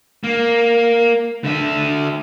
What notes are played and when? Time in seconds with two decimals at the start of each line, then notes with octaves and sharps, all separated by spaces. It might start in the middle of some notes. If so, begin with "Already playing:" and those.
0.24 A#3
1.44 D3 E5